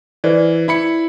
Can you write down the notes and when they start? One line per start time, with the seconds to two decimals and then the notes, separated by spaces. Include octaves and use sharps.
0.24 E3 B4 C5 D5
0.68 E4 B5 C#7